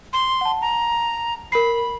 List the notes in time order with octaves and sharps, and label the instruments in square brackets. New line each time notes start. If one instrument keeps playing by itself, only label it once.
[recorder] C6
[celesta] F#5 A5
[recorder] A#5
[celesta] A#4 C7 [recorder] B5